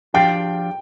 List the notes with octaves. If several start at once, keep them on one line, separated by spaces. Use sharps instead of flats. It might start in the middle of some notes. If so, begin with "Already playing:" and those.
F3 D4 G4 F5 G5